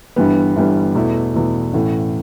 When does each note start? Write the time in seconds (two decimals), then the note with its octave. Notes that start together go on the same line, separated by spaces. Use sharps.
0.16 G1 G2 E3 G3 B3
0.56 G1 G2 E3 G3 B3
0.95 E2 B2 A3 E4
1.34 E2 B2 A3 E4
1.73 A1 A2 E3